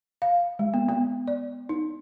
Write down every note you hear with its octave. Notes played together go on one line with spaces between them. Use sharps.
F5
G#3
B3
B3
D5
D#4